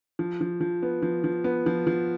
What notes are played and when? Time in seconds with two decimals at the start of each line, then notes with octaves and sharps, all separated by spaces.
0.19 F3
0.41 F3
0.61 F3
0.82 B3
1.02 F3
1.24 F3
1.44 B3
1.66 F3
1.87 F3